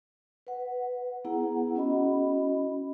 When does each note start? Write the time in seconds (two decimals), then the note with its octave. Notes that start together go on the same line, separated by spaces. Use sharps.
0.47 B4 F#5
1.24 B3 E4 G#4 F#5 A#5
1.75 C#4 F#4 D#5 B5